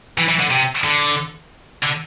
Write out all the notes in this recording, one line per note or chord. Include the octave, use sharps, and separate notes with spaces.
E3
E3
D3
C3
D3
D3